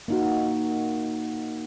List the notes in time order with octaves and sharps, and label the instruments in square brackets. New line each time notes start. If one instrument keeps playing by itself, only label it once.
[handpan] A#3 D#4 F#4